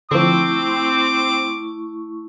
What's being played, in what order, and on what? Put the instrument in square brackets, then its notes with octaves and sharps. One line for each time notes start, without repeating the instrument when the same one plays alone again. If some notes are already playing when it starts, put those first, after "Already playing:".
[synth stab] D3 F3 [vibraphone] A3 E4 C#6 [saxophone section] C4 [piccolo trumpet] D6